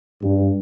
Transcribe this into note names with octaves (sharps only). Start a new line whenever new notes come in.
G2